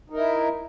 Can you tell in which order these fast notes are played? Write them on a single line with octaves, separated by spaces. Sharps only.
D#4 A#4 E4